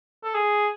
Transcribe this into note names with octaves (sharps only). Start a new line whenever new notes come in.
A4
G#4